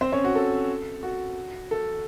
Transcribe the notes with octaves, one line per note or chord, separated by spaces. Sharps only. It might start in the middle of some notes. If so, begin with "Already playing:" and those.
C4 C5
C#4 C#5
F#4
A4
F#4
A4